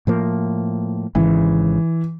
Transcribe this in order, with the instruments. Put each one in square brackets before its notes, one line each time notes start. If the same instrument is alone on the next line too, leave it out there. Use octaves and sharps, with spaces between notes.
[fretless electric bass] A2 F3 A#3
[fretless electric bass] G#1 G#2 C#3 [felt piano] E3